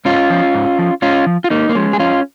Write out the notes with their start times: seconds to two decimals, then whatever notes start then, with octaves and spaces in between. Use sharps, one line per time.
0.05 G#2 C#4 F4
0.30 F3
0.54 G#2
0.79 F3
1.02 G#2 C#4 F4
1.26 F3
1.44 F4
1.50 G#2 A#3 D#4
1.69 A#3
1.75 F3 G#3 C#4
1.93 G#4
2.00 F2 C#4 F4